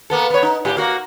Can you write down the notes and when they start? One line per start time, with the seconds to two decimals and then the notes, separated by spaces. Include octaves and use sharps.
0.10 A#3 B3 A4
0.30 B3 C#5
0.42 D#4
0.65 A2 G4
0.77 A#3 F#4